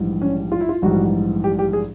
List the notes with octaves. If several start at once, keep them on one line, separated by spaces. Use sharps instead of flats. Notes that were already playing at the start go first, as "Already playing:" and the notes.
Already playing: A#1 G#2 E3 G3
C#4
F4
E4
F4
A#1 G#2 E3 G3 F#4
G4
G4
G#4